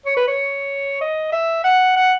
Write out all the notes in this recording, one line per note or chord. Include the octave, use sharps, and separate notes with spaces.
C#5
B4
C#5
D#5
E5
F#5
F#5